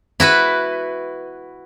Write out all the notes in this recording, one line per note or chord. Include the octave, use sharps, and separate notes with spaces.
E4 F#4 B4